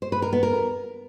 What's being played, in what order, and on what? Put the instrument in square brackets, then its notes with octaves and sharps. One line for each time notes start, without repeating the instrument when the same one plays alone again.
[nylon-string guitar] C5
B4
A#4
B3
A#4